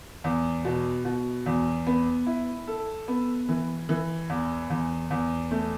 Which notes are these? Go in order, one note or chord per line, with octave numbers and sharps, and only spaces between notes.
E2
B2
B2
E2
B3
E4
A4
B3
E3
E3
E2
E2
E2
A3